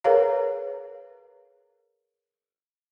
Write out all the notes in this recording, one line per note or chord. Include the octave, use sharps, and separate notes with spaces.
G#4 A#4 B4 C#5 F5 A#5